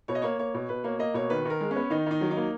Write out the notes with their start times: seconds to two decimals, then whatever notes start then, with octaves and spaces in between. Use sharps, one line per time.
0.08 B2 C#5
0.15 D#5
0.22 A#3 C#5
0.39 A#3 C#5
0.54 B2
0.69 B2 B4
0.84 A#3 C#5
0.99 A#3 D#5
1.14 B2 C#5
1.30 D#3 B4
1.45 D#3 A#4
1.61 G#3
1.71 C#4
1.76 B3
1.90 D#3 D#4
2.06 D#3 D#4
2.21 F#3
2.31 D#4
2.37 A#3